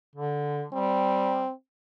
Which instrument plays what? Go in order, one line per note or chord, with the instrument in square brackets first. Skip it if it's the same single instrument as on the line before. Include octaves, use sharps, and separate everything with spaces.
[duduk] D3
[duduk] G3 [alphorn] C4